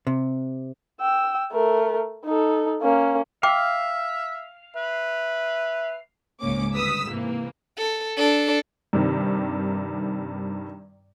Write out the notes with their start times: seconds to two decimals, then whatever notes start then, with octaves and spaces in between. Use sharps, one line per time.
0.07 C3
1.01 G5 E6
1.52 A3 A#4
2.25 D#4 A4
2.82 A#3 C#4
3.43 E5 F5 G5 D6
4.76 B4 E5
6.40 C#2 G#2 C#3 A#3 C#4 D6
6.74 D2 G3 B4 D#6 E6 B6
7.08 G#2 C3 E3 A#3
7.78 A4
8.18 D4 A4
8.93 G2 C3 D#3